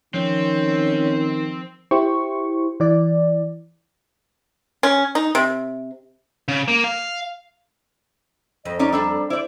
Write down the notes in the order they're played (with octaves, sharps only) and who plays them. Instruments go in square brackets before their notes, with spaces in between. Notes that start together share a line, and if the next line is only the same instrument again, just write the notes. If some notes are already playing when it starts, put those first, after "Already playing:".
[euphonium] D#3 [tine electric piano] F3 [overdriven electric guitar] C4 [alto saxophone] C#4
[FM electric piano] E4 G4 C5 C#6
E3 D5
[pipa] C#4
D#4
C3
[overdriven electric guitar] C#3
A#3
F5
[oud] F2 [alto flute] D#5
[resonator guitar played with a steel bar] C#4 D#4 D5 [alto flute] A#5
[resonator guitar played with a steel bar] G3 D4 A4
[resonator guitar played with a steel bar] E4 D5 [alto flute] C5